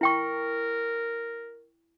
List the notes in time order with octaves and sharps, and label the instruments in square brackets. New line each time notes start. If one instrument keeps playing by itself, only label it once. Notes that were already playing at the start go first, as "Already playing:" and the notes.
[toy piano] E4 G5 C#6 [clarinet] A#4